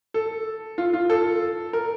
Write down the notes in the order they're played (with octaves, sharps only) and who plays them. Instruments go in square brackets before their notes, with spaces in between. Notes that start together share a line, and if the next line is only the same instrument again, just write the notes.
[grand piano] A4
F4
F4
A4
A#4